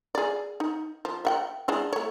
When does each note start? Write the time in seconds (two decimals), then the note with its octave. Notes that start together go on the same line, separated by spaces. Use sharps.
0.15 G#4 D5
0.60 D#4
1.05 F3
1.25 E5 F#5 G5
1.68 G#3 D4 E4
1.93 A3 C#5